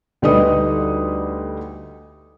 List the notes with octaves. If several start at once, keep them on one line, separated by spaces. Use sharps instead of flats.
D2 G3 D#4 B4 D#6